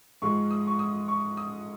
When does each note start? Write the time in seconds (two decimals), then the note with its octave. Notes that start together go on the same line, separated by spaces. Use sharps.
0.22 G#2 F3 G#3 C#6
0.51 D#6
0.67 C#6
0.79 D#6
1.08 C#6
1.37 D#6